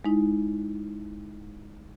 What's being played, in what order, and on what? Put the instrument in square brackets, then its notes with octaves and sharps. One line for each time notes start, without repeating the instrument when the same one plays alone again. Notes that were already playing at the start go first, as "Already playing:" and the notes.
[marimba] G#3 D#4 E4